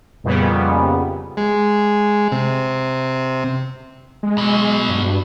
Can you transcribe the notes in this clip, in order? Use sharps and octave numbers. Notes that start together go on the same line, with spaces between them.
F2 A#2 C#3 G3 B3
G#3
C3
G#3
B2 F#3
G2